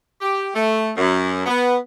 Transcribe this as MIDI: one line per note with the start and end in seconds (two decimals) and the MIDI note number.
0.21 0.49 67
0.54 0.91 57
0.97 1.43 42
1.46 1.75 59